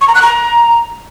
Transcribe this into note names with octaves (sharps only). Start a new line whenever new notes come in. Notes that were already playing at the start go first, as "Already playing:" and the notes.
C#6
A#5
F#6
A#5